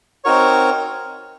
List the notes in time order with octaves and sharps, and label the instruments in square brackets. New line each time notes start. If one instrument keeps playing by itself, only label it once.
[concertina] C4 D#4 F#4 A#4 C#5